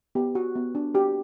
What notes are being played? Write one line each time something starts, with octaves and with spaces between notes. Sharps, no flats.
B3 G4
F#4
B3
D4
F#4 G4